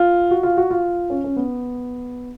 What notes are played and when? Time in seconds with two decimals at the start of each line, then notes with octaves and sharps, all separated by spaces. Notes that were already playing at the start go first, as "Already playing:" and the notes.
Already playing: F4
0.31 F#4
0.43 F4
0.57 F#4
0.70 F4
1.10 C#4
1.24 C#4
1.36 B3